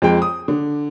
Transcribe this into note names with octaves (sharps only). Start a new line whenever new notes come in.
F2 G#3 G5
D#6
D3